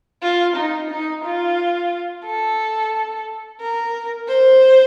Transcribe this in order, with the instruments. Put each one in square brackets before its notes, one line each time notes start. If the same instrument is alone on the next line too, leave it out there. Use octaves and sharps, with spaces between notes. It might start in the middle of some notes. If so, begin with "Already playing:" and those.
[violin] F4
D#4
D#4
F4
A4
A#4
C5